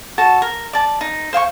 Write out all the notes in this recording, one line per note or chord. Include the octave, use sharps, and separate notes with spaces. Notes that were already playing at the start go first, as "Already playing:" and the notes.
F#4 A4 A5
A#4
D5 A5
D#4
C5 F5 G5 C#6